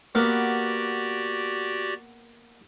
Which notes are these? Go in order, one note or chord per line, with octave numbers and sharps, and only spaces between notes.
A#3 B3 F#4 G4 D5